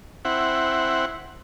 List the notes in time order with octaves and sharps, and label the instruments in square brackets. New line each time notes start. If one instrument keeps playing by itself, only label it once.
[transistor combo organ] C4 E4 F#5